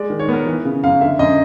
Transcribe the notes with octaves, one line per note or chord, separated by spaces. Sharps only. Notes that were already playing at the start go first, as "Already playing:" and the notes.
Already playing: G#3 D5
D#3
C#5
B3 A#4
E3 B4
C#3
F#2 F5
D3 E5
F#2 D#5